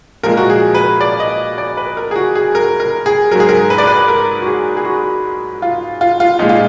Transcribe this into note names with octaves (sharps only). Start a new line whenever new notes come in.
A#2 F3 G#3 A#4
F#4
G#4
B4
D5
D#5
D5
B4
A#4
G#4
F#4
G#4
A#4
A#4
G#4
G#2 F#3 G#4 A#4
A#4
B4
D5
B4
A#4
F#4
G#4
G#4
F#4
F4
F4
F4
A#2 F3 G#3 D#4
F4